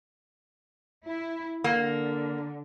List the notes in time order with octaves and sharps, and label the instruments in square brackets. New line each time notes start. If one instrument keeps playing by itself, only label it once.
[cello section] E4
[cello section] D3 [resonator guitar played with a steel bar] A#3